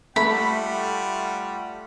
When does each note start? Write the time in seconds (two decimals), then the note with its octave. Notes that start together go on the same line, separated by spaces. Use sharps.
0.16 G3 A3 F4 F#5 B5